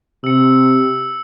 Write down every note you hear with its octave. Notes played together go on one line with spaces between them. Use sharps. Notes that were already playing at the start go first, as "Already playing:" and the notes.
C3 E6 C#7